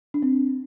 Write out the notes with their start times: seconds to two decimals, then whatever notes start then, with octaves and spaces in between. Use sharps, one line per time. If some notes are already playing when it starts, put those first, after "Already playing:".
0.14 D4
0.22 C4